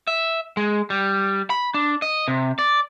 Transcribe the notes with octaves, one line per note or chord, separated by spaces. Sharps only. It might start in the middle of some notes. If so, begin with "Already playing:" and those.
E5
G#3
G3
B5
D4
D#5
C3
D5